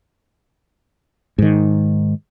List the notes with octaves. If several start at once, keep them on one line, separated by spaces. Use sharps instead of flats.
G#2 D#3